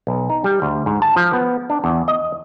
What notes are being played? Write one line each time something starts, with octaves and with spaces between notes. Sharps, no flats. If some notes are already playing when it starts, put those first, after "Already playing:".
B1
D#4
G3
D2
G#2
A5
F3
B3
D4
E2
D#5